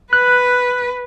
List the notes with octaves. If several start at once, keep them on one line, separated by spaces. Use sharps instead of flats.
B4 F#6